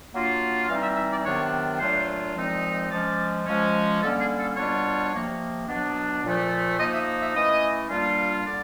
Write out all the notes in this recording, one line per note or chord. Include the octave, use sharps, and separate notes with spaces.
F#3 A#3 D4 F4
E3 G3 C4 D#4 F5
E5
E5
D5
C3 D#3 F#3 B3 D4 C#5
A#2 F#3 A3 D4 F4 C5
A#2 F3 G#3 C4 D#4
F3 G#3 C#4 D5
F3 G#3 C#4
D3 G3 A#3 C#4 A4
G#4
A4
B2 G3 B3 D4 F4 C#5
C3 F3 A#3
B2 F#3 B3 D4
A#2 F3 A3
F3 A#3 D#4 D#5
E5
E5
E3 A3 C#4 E4 D#5
A#2 G3 A#3 D4 F4
D3 G3 D5